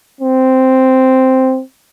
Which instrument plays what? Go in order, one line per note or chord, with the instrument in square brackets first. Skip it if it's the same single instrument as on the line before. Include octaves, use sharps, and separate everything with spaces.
[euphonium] C4